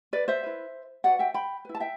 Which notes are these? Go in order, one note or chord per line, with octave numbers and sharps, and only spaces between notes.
B4 D5
C5 E5
E4 B4
F#4 B4 D5 F#5
E5 G5
G5 B5
E4 B4
A5
E5 G5